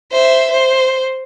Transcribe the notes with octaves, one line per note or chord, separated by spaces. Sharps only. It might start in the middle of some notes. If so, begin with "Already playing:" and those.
C5 E5
C5